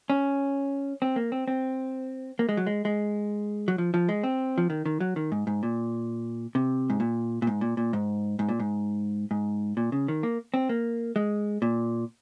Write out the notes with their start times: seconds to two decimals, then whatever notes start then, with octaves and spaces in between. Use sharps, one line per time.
0.10 C#4
1.02 C4
1.16 A#3
1.32 C4
1.48 C4
2.39 A#3
2.49 G#3
2.57 F#3
2.67 G#3
2.85 G#3
3.68 F#3
3.78 F3
3.94 F3
4.09 G#3
4.23 C4
4.58 F3
4.70 D#3
4.86 D#3
5.00 F#3
5.16 D#3
5.32 G#2
5.47 G#2
5.63 A#2
6.55 C3
6.90 G#2
7.00 A#2
7.42 A#2
7.47 G#2
7.61 A#2
7.77 A#2
7.93 G#2
8.39 G#2
8.49 A#2
8.59 G#2
9.31 G#2
9.77 A#2
9.92 C#3
10.08 D#3
10.23 A#3
10.54 C4
10.69 A#3
11.16 G#3
11.62 A#2